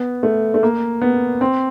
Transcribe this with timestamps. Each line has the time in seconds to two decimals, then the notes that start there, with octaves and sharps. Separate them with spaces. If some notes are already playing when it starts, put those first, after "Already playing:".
Already playing: B3
0.23 A3
0.54 A3
0.63 A#3
1.02 B3
1.41 C4